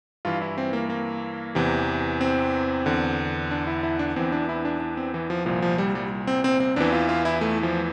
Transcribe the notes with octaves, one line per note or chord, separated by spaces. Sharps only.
G2 E3 F4
E4
C4
A#3
A#3
E2 C3 E3
C4
E2 D3
D4
E4
E4
D4
E2 E3 C4
D4
E4
D4
D4
C4
E3
F3
C2 A#2 F3
F3
G3
G3
C4
C4
C4
E2 E3 D4
F4
F4
E4
A3
F3